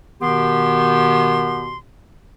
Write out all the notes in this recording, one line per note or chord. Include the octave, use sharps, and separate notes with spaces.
B2 D#3 B3 G4 C6